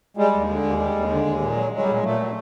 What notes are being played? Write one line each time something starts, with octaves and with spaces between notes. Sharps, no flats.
G3 G#3
D#2
D3
D#2
G3
D#2
D3
D#2
A#2
F#3
F#3
G3
A#2 G#3
A#2 A3
F#3